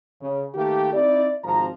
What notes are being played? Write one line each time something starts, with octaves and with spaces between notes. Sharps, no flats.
C#3
D#3 A3 A#3 G4
C4 D#4 E4 D5
G#1 C3 F3 A#5